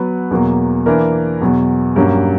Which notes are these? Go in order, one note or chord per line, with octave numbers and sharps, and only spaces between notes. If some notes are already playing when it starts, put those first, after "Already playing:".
Already playing: F#3 B3 F#4 B4
E2 B2 F#3 A#3
E3 A#3 D4 A#4
E2 B2 F#3
G2 F#3 A#3 C#4